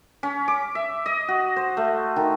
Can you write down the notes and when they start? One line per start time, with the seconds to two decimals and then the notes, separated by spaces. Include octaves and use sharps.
0.23 C#4
0.48 D6
0.75 E5
1.06 D#5
1.28 F#4
1.56 C5
1.77 A3
2.16 D#3